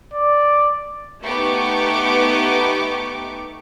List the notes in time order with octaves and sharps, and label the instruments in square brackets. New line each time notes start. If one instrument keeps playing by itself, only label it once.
[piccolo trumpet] D5
[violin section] A3 B3 D#4 G4 C#6 D6